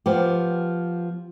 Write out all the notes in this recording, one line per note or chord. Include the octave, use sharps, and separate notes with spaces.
F3 B3 G4